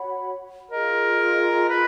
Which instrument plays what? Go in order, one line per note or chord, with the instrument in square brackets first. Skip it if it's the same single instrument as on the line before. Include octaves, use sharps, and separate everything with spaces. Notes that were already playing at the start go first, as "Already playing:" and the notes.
Already playing: [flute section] F#4 C#5 F#5 B5
[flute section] F4 G#4 D#5 [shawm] A#4
[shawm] B4